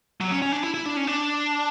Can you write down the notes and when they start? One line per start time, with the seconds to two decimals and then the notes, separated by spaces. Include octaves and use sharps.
0.20 F#3
0.31 C#4
0.42 C#4
0.52 D4
0.64 E4
0.74 E4
0.86 D4
0.97 C#4
1.07 D4